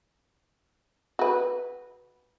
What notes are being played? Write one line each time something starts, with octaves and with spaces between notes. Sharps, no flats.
F#4 B4